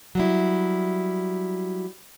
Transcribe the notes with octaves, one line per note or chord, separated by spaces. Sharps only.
F#3 G3 E4